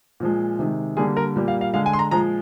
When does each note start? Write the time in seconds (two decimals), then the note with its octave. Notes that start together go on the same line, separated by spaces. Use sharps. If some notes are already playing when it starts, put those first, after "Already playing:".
0.20 A#2 F3 G#3
0.59 C3 D#3 G#3
0.97 D3 G3 A#3 G#4
1.17 A#4
1.36 A#2 G3 A#3
1.48 F5
1.61 F5
1.74 D3 G#3 F5
1.86 G#5
1.93 C6
1.99 A#5
2.11 A#2 F3 G#3 A#5